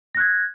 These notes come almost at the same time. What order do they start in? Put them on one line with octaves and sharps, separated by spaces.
A#6 F#6 G#6